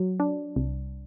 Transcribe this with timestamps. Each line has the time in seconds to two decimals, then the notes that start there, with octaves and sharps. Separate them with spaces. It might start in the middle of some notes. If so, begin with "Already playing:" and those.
Already playing: F#3
0.20 D4
0.56 C2